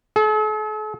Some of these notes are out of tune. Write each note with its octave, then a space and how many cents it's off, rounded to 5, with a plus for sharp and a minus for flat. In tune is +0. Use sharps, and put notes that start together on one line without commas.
A4 -45